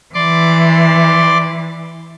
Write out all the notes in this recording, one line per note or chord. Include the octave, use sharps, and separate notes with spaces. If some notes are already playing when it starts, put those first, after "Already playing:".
E3 D5 C6 D6